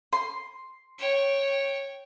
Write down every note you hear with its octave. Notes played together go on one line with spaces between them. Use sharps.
C6
C#5 G5